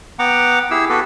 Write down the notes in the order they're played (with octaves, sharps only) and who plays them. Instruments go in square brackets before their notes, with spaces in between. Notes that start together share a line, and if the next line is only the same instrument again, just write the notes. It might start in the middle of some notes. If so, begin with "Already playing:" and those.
[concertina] B3 F#5 G5 A#5 D6
E4 G4 G#4 E6
B3 F#4 G4 A4 B4